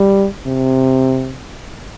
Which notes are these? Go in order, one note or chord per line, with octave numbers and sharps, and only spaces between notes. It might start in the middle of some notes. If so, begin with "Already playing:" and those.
Already playing: G3
C3